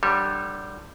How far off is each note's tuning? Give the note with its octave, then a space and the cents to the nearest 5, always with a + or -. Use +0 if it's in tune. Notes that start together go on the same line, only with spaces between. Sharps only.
D3 +20 G3 -10 C#5 -30